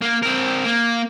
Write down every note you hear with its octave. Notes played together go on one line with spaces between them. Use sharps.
A#3
C4 A#4
A#3